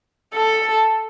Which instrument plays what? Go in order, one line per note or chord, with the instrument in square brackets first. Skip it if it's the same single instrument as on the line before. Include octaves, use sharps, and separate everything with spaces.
[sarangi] A4